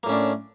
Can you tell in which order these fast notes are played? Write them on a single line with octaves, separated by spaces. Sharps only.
A#3 A2 C#4 D4